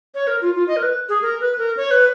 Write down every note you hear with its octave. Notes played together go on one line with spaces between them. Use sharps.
C#5
A#4
F4
F4
D#5
A#4
B4
G#4
A#4
B4
A#4
C#5
B4